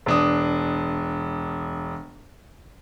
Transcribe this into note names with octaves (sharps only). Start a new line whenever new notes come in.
E1 D4 D#6